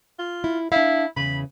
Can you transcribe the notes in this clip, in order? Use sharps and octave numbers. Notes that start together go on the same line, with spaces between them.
F4
E4
D4 E4 F5
E2 C#3 B5